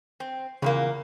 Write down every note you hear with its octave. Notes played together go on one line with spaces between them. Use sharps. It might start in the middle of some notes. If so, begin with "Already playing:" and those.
C4
E2 A#2 C#3 A#3